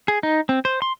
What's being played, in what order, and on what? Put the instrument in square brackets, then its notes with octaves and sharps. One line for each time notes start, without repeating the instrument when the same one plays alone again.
[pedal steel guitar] G#4
D#4
C4
C5
C6